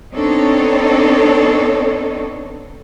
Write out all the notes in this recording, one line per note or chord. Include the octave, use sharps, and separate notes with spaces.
B3 C4 D4 D#4 A4 C#5